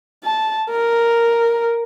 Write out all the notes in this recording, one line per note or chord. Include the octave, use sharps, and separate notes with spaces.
A5
A#4